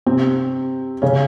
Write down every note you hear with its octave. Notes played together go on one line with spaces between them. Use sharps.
C3 C4
C#3 C#4